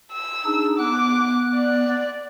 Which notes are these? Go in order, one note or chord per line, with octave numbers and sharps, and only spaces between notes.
E6
D4 D#4 G#4
B3 D6 F#6
D5